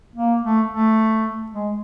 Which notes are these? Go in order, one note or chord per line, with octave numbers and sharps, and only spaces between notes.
A#3
A3
A3
G#3